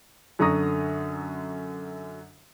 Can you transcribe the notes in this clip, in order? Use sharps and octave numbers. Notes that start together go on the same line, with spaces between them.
F#2 D3 A#5 C#6 D#6 A#6